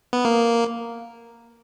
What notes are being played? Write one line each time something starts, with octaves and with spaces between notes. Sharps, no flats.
B3
A#3